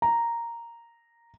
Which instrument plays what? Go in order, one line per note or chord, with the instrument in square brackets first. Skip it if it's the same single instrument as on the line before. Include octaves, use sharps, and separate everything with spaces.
[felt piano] A#5